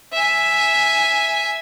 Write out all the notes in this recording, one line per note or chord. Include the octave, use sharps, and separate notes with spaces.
E5 G#5